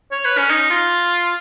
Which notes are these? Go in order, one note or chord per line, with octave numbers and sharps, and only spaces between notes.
C#5
B4
C#4
D#4
F4